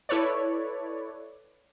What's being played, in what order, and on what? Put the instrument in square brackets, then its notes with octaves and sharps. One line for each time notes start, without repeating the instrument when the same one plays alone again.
[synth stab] E4 A4 B4 C#5 D5